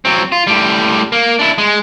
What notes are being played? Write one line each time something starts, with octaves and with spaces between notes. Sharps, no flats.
F#3 C4
F4
A2 G3
A#3
D4 E4
G#3